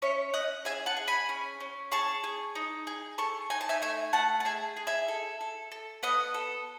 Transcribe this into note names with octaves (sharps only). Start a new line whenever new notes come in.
C#4 C#5 E5
C#4 D#5 F#5
G#4 E5 G#5
F#5 A5
G#4
G#5 B5
C#4
C#4
G#4 A5 C#6
G#4
D#4
G#4
A4 A5 C#6
D#4 G#5
A5
E5 G#5
A3 E5 G#5
A3 F#5 A5
A5
G#4 E5 G#5
G#4
E5 G#5
A4
A4
A4
B3 D#5 F#5
A4